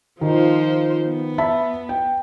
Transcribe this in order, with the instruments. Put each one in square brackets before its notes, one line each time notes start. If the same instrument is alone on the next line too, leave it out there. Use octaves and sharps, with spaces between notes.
[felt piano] D#3 [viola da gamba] F3 F4 C5
[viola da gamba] B3
[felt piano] E5 A5 B5
G5